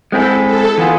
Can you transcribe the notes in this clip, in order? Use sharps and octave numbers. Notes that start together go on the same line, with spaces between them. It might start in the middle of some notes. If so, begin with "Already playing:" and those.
G#3 C4 E4 G#4 A4
A4
E3 B3 F4 G#4